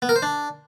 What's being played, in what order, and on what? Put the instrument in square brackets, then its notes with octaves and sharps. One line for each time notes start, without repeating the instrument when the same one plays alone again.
[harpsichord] B3
A#4
C5
D4